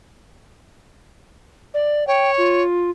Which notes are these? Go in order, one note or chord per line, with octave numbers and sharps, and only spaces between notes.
D5
C#5 G5
F4